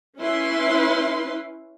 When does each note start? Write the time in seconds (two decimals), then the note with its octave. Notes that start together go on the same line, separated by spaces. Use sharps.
0.18 C#4 E4 B4 C6